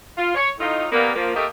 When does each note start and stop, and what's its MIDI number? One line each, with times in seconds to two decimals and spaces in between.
0.17 0.33 65
0.35 0.49 73
0.59 0.86 45
0.59 0.86 63
0.59 0.86 65
0.92 1.12 55
0.92 1.12 58
0.92 1.12 59
1.16 1.32 53
1.16 1.32 58
1.35 1.46 57
1.35 1.46 58
1.35 1.46 67
1.35 1.46 69
1.35 1.46 70
1.35 1.46 75